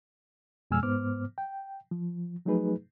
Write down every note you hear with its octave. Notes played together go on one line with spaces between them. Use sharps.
F2 B2 G#3 G#5 E6 F6
G#2 B3 C5 D6 F6
G5
F3
F3 F#3 A3 D#4 G#4 B4